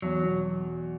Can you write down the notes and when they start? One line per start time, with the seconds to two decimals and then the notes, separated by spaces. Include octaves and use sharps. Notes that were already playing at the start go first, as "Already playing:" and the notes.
0.02 E2 F#3
0.23 B2